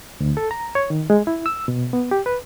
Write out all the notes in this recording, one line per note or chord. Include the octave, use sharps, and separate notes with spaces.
D2
A4
A#5
C#5
D#3
G#3
E4
E6
B2
B3
G4
B4